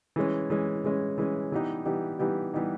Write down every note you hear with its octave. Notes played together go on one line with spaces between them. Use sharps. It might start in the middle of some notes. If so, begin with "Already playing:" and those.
E3 G#3 C#4
E3 G#3 C#4
E3 G#3 C#4
E3 G#3 C#4
E3 G3 B3 D#4 G4
E3 G3 B3 D#4 G4
E3 G3 B3 D#4 G4
E3 G3 B3 D#4 G4